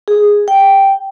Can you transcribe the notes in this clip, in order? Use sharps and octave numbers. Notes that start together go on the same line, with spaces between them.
G#4
G5